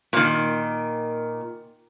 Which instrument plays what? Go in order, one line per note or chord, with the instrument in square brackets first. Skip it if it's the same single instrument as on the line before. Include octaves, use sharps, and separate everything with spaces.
[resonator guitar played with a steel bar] A#2 D#3